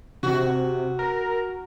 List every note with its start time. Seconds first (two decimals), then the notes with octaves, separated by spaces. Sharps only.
0.23 C3 F#4
0.99 A#4